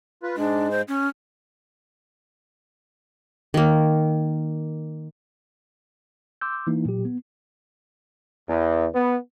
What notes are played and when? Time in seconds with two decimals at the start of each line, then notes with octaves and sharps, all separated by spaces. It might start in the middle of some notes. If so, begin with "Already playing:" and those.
0.23 F4 B4
0.37 G#2 G#3 D4
0.71 C5
0.88 C#4
3.54 D#3 A#3
6.41 C6 D6 E6 G6
6.67 E3 A#3 D#4 E4
6.86 A#2 F#3 G4
7.05 B3
8.48 E2
8.95 B3